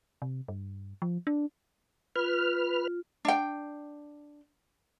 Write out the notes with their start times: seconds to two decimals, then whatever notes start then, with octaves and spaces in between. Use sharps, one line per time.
0.22 C3
0.48 G2
1.02 F3
1.27 D4
2.16 F4 B4 F6
3.25 D4 G5